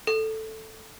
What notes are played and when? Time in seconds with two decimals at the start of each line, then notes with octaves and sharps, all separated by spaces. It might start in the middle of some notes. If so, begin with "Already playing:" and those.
0.07 A4